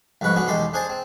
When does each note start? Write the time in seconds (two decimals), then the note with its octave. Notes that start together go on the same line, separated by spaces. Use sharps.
0.21 C2 F2 G#2 B4 F#5 C#6
0.36 B3 C#4 D4 F#4
0.48 B1 E2 G#3 G4 A4 C6
0.74 D4 G#4 C5 G#5 A5
0.90 C4